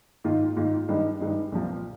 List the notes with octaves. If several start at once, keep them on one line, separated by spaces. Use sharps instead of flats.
G#2 D#3 A#3 F4
G#2 D#3 A#3 F4
G2 D#3 G#3
G2 D#3 G#3
C2 A#2 F3 A#3